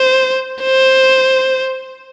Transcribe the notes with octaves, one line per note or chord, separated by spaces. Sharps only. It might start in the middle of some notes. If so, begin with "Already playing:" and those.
Already playing: C5
C5